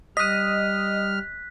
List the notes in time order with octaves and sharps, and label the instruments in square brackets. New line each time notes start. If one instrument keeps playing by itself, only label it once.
[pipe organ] G3 F6 [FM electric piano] D#5 D#6 [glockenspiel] F#6 B6